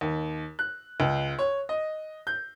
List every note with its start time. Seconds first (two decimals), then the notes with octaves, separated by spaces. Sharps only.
0.01 D#2
0.59 F#6
1.00 C#2
1.39 C#5
1.69 D#5
2.27 G6